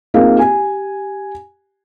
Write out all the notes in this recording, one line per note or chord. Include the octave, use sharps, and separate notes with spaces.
A#3 C4 D#4 F4 G#4 F5
G4 G#5